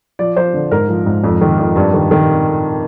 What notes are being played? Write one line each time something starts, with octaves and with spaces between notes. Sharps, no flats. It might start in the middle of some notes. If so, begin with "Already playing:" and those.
F3 D5
F3 C5
D3
G#2 A#4
F3
G#2
F2
D#3
F2
G2
D#3
D#3